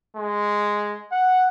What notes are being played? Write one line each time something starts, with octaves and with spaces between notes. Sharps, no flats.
G#3
F#5